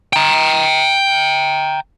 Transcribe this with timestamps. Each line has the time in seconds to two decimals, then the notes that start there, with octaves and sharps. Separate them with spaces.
0.13 G5 A#5